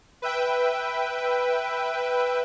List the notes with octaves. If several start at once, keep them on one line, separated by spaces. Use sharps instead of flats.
B4 E5 G5